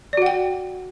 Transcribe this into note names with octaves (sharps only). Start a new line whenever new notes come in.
F#4 D5 F#5 G5